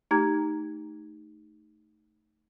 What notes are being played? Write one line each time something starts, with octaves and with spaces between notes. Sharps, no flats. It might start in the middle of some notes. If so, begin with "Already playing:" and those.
A3 D#4 G4 A#5 G#6